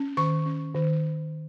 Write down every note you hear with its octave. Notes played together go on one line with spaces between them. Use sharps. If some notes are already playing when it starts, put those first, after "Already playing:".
Already playing: C#4
D#3 C#6
C#4
D#3